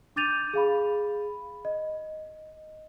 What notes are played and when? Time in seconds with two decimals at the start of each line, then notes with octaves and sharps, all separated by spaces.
0.16 D4 D6 G6 A6 D#7 F7
0.54 G#4 F5 B5
1.65 D#5